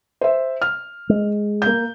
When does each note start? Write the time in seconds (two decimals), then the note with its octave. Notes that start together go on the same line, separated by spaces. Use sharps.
0.21 C5 E5
0.62 F6
1.09 G#3
1.62 A#3 G6